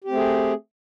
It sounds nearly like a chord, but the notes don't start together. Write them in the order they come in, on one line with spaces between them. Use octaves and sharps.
G4 C4 A3 G#4